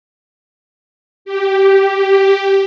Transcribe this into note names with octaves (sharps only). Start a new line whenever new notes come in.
G4